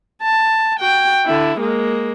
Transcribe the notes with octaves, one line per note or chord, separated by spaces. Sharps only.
A5
F#4 G5
D3 E4
G#3 A#3